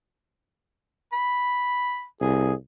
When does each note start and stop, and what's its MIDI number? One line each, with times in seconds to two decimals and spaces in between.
1.12 2.04 83
2.21 2.52 36
2.21 2.54 68